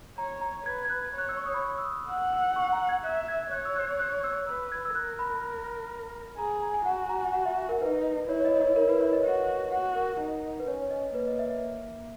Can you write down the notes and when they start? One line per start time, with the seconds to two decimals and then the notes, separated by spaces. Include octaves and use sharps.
0.17 C#5 A#5
0.41 A#5
0.66 B4 G#6
0.85 G#6
0.90 F#6
1.14 C#5 F#6
1.29 E6
1.37 C#6
1.45 D#6
1.54 B5
1.62 C#6
1.78 E6
1.85 D#6
2.09 F#5 E6
2.33 E6
2.56 C#6
2.73 A#5
2.89 G#6
3.04 E5 F#6
3.28 G#6
3.51 C#5 F#6
3.65 E6
3.76 F#6
3.99 F#6
4.24 E6
4.47 B4 E6
4.72 G#6
4.85 E6
4.95 A#4 F#6
5.19 B5
6.38 G#4 A#5
6.50 G#5
6.62 A#5
6.74 G#5
6.86 F#4 F#5
6.98 G#5
7.09 A#5
7.17 F#5
7.21 G#5
7.34 F#5
7.46 E5
7.69 A#4
7.81 D#4 B4
8.29 E4 C#5
8.40 C#5
8.45 D#5
8.56 D#5
8.61 C#5
8.76 A#4
8.89 B4
9.00 C#5
9.13 D#5
9.24 F#4
9.71 F#4 F#5
9.95 A#4
10.20 D#4
10.60 B4
10.68 C#4 C#5
10.82 C#5
10.91 D#5
11.15 A#3 B4
11.28 D#5
11.39 E5
11.51 E5